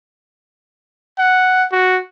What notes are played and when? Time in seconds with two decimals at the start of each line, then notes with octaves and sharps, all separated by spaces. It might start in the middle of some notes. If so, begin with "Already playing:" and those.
1.19 F#5
1.72 F#4